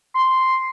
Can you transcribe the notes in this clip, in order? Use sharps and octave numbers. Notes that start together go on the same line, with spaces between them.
C6